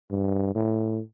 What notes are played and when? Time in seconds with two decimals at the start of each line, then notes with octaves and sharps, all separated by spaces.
0.11 G2
0.55 A2